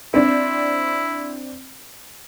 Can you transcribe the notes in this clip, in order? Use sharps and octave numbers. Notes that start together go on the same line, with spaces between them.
C4 D4 E4